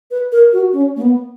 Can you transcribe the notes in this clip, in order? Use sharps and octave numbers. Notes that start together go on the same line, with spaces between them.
B4
A#4
F#4
C#4
A#3
B3